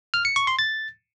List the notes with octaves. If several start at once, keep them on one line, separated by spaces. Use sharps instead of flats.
F6
C#7
C#6
C6
A6